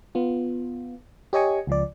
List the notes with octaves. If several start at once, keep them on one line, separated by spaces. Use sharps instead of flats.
B3 F4
G4 C#5 D#5 G#5 C#6
C#2 F3 D5